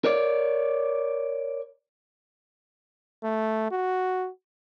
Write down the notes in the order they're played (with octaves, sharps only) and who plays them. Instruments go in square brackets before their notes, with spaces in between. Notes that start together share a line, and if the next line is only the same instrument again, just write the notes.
[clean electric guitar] A#4 C#5 D5
[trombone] A3
F#4